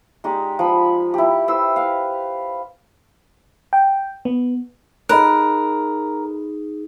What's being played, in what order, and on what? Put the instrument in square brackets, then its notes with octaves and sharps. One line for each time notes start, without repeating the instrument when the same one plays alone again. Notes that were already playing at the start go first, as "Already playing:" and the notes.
[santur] G#3 D#4 G4 D5
F3 B5
E4 G4
E4 B4 C5 E6
F5
[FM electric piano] G5
B3
[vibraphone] D#4 G#4 [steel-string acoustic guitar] A#4 [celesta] D#5 B5 F#6